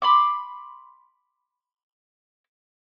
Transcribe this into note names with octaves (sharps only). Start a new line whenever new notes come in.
B5 C6 D6